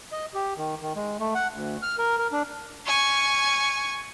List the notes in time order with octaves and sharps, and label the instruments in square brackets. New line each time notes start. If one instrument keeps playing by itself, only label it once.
[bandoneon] D#5
G4
D#3
D#3
G#3
A3
F#5
D2
F6
A#4
A#4
D4
[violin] G#5 C#6